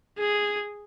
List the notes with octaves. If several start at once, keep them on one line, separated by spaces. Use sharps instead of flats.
G#4